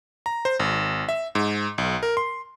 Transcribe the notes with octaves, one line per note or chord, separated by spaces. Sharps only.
A#5
C5
G#1
E5
G#2
B1
A#4
C6